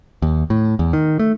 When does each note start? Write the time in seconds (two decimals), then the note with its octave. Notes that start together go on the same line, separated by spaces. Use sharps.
0.22 D#2
0.50 A2
0.79 E2
0.93 D#3
1.19 A3